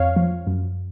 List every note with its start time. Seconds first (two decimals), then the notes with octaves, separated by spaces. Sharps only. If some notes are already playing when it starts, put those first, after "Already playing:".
Already playing: F2 C#5 F5
0.16 F3
0.47 F#2